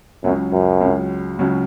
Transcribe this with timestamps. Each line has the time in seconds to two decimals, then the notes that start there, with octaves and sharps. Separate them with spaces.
0.23 C#2 F#2 C#3 F#3
0.52 F#2
0.81 C#2 C#3 F#3
1.39 C#2 C#3 F#3